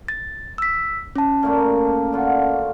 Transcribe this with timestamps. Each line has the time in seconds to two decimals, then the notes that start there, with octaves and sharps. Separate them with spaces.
0.08 A6
0.58 E6 B6
1.16 C#4 A5
1.43 A#2 A3 A#3
2.12 D3 F4 F#4